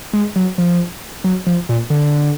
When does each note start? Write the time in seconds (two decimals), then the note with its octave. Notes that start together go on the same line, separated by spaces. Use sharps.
0.13 G#3
0.36 F#3
0.58 F3
1.24 F#3
1.46 F3
1.69 A#2
1.90 D3